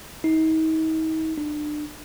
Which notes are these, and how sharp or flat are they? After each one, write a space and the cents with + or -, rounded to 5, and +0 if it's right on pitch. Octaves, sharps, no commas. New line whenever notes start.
D#4 +40
D4 +30